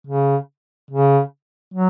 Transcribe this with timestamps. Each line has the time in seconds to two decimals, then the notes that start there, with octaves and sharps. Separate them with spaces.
0.07 C#3
0.91 C#3
1.74 F#3